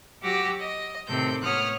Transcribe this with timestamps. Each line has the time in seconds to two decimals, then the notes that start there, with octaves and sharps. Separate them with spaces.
0.21 F#3 F#4 G4 D6 E6 A#6
0.60 D#5
1.08 A2 C3 D#3 C4 A4 G6
1.42 A2 B3 C#5 D#6 F6 F#6